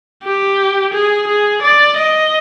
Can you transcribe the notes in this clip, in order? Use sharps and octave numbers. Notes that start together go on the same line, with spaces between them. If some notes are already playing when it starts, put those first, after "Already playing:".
G4
G#4
G#4
D5
D#5